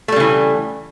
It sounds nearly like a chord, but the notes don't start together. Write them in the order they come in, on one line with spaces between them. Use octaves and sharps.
A3 G3 C#3 E3